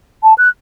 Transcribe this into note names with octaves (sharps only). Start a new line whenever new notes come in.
A5
F#6